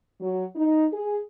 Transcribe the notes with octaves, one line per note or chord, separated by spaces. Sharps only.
F#3
D#4
G#4